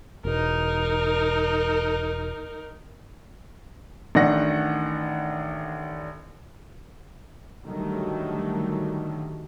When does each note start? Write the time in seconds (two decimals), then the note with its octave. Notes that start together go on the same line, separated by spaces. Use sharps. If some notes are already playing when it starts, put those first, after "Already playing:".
0.25 E1 D#4 A#4
4.15 A1 D#3 D4 F#5 A#6
7.64 D3 D#3 F#3 G3 A3